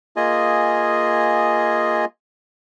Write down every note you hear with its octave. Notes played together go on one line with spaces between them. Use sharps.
A#3 F4 G#4 D#5 G#5